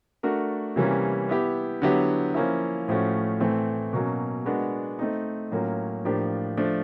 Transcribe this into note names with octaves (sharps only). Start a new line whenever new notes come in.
A3 D4 F#4 A#4
C3 E3 G3 A#3 C#4
B3 E4 G4
D3 F#3 B3 E4 G4
F3 A#3 C#4 E4
A2 F3 A3 C#4 F#4
A2 E3 A3 C4
B2 F#3 A#3 C#4
G#3 B3 D4 F#4 A#4
A3 C4 D#4
A2 F#3 A#3 C#4 F4
A2 F3 A#3 D4 G4
F3 A3 D4